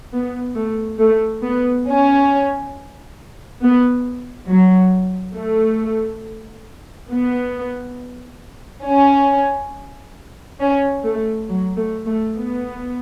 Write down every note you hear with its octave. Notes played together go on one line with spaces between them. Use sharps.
B3
A3
A3
B3
C#4
B3
F#3
A3
B3
C#4
C#4
A3
F#3
A3
A3
B3